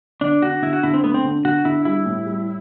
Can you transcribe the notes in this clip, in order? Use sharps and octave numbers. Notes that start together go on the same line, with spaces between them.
D3 D4
D3 F#4
D3 E4
F#4
D3 E4
C4
A3 B3
C4
D3
D3 F#4
D3 E4
G3 E4
A2
G3